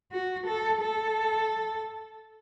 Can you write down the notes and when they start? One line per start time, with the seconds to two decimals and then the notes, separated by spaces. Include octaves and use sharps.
0.12 F#4
0.46 A4
0.81 A4